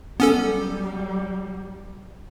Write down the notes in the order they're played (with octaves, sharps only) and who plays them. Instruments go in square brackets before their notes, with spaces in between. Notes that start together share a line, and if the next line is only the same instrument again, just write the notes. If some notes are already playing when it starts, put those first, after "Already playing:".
[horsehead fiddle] F#3 G3 [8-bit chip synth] B3 C#4 A4